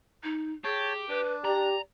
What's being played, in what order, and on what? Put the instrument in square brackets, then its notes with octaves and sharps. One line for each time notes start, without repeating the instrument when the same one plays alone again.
[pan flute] D#4
[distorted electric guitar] G4 [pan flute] G#4 [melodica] C#5 G5 A5
[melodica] D4 [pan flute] B4
[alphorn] G4 [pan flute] D5 [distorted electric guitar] A#5